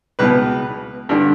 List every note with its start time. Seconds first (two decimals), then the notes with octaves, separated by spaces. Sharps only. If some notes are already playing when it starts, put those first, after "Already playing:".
0.19 C#2 B2 B4
1.09 G2 D3